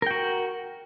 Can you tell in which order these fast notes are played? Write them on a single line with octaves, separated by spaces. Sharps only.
A#4 G5 F#4